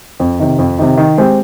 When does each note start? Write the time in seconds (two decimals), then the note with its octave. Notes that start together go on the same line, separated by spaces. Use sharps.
0.20 F2
0.39 C3 D#3
0.59 F2
0.79 C3 D#3
0.97 D#3
1.18 G#3 C4 G4